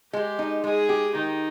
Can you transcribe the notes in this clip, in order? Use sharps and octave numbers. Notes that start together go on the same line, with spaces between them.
G#3 G4
D#4
G#3 G#4
G4
D#3 D#4